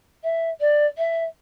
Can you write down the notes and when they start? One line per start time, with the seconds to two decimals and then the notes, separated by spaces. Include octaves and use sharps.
0.23 E5
0.60 D5
0.97 E5